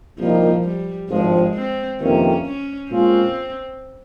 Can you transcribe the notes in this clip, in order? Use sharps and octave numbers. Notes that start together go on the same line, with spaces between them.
C2 A#2 F3 G3 A#3 D#4
G3
G#1 G2 F3 G#3
C4
G1 F2 C3 D#3 A#3 C#4
C#4
A#2 G#3 C4 C#4 F4